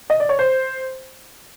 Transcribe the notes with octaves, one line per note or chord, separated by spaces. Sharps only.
D#5
D5
C#5
C5